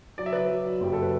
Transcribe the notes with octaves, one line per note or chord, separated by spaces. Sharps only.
F#3 D5
E5
F#3 B4 D5
F#3
F#3
F#1 G4
A4
B4